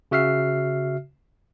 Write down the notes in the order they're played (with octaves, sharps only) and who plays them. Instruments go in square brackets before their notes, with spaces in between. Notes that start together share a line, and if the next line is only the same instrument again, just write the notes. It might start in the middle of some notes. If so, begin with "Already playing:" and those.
[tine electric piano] C#3 F#4 E5 F6 C7